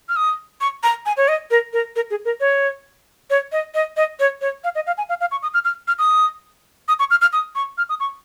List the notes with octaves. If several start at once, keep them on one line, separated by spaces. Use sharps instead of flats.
F6
D#6
C#6
A#5
G#5
C#5
D#5
A#4
A#4
A#4
G#4
A#4
C#5
C#5
D#5
D#5
D#5
C#5
C#5
F5
D#5
F5
G#5
F5
F5
C#6
D#6
F6
F6
F6
D#6
D#6
C#6
F6
F6
D#6
C#6
F6
D#6
C#6